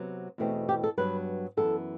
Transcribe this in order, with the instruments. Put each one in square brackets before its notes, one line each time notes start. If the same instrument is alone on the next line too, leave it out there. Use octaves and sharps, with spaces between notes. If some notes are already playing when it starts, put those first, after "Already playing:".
Already playing: [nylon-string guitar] C3 F#3 B3
E2 B2 A3 C4
G4
A4
G2 F#3 B3 B4
F#2 E3 B3 A4